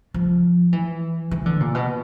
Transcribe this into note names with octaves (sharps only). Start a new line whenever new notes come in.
F3
E3
E3
D3
A#2
B2